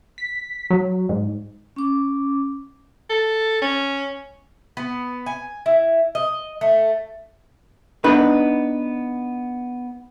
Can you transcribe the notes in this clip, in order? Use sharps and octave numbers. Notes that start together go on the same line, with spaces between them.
B6
F#3
G#2
C#4 D6
A4
C#4
B3
G#5
E4
D#5
A3
B3 D4 D#4 B4